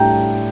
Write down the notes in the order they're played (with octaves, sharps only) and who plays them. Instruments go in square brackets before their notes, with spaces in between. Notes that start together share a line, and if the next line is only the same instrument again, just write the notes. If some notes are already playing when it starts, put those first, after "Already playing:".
Already playing: [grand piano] A2 G3 D4 G5 A#5